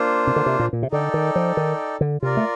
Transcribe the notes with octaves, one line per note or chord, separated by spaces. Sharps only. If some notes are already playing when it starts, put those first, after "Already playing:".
Already playing: A#3 D4 F4 C5
C3
D3
C3
A#2
A#2
C3
D3 D#4 A4 D5 G5
D#3
F3
D#3
D3
C3 F4 A#4 D5
A3